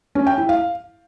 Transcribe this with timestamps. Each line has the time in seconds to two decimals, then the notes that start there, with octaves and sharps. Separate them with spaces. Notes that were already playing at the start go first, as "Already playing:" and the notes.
0.15 C#4
0.27 G5
0.38 E4
0.49 F5